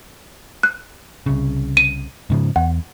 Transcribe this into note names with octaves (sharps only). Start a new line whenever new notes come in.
F#6
C2 C#3
D#7
G#2 C#3 F3
E2 F#5